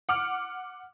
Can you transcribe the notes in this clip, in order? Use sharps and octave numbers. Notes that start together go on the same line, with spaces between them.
F#5 D6 F6